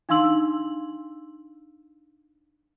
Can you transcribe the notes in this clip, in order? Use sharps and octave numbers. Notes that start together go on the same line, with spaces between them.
D4 D#4 F5 C6 E6 F#7